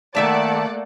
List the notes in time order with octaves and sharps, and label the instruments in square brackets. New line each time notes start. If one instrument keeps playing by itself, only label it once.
[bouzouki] D#3 E5 A5 [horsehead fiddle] A3 A#3 [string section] D5 F#5